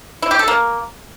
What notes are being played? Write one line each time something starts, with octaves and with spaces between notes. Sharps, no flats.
E4
G4
A4
A#3